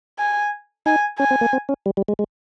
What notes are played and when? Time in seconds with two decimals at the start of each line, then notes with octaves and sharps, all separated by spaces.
0.19 G#5
0.86 D#4 G#5
1.18 C#4 G#5
1.31 C4
1.41 A#3
1.53 C4
1.69 C#4
1.86 G3
1.97 G3
2.08 G#3
2.19 G#3